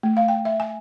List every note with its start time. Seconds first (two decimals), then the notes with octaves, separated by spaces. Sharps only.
0.03 A3
0.17 F5
0.28 G5
0.45 E5
0.60 G#5